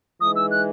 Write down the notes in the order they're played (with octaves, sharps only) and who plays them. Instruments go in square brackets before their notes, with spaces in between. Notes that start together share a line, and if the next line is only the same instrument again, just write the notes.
[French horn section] E3 G#3 D#4 [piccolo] D#6
[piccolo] E6
F#6